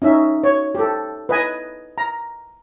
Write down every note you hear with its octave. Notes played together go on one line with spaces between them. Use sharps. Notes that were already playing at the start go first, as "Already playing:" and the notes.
C#4 D#4 E5
C#5
G4 A4
B4 D#5 G#5
A#5